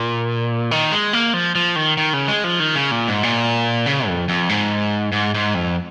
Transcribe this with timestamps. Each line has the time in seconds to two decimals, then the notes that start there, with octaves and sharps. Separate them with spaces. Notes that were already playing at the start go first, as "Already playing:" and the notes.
Already playing: A#2
0.71 D#3
0.92 G#3
1.13 A#3
1.34 F3
1.55 F3
1.76 D#3
1.97 D#3
2.13 C#3
2.28 G#3
2.44 F3
2.60 D#3
2.76 C#3
2.91 A#2
3.08 G#2
3.23 A#2
3.86 C#3
4.08 F2
4.29 F2
4.49 G#2
5.12 G#2
5.34 G#2
5.54 F2